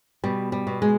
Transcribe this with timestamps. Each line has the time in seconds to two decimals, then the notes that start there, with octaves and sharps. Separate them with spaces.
0.24 B2 G3
0.52 G3
0.67 B2
0.82 G#3